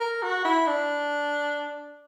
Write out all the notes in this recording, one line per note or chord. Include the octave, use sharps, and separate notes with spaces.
A#4
F#4
E4
D4